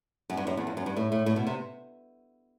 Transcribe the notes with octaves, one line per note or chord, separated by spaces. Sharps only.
F#2
G2
F#2
E2
F2
F#2
G2
A2
A2
A2
B2
C3